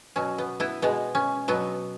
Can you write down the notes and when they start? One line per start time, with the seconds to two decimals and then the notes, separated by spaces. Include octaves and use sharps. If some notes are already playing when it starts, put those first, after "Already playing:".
0.16 B2 F#3 C#4
0.38 B3
0.60 B3 E4
0.82 B2 G#3 B3
1.15 C#4
1.48 B2 F#3 B3